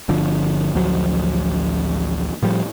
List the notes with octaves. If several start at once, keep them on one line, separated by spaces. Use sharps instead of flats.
G1 D3 F3
A1 D2 F3 F#3
A2 F3 G3